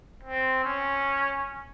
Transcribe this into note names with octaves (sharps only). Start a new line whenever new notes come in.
C4
C#4